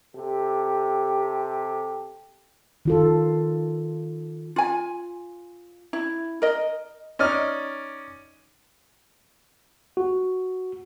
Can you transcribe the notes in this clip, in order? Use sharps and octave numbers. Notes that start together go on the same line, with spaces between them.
C3 G4 A4
D#3 F4 A4
F4 G#5
E4
A#4 D#5
C#4 D#4 D5 F6
F#4